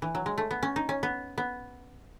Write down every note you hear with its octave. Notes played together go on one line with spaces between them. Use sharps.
E3
F#3
G#3
A3
B3
C#4
D#4
C#4
B3
B3